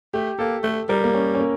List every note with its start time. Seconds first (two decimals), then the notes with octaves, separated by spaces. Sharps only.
0.14 A3 G4
0.39 A#3 A4
0.63 A3 A4
0.89 G3 A#4
1.04 A#3
1.14 C#4
1.35 C#4
1.40 A#3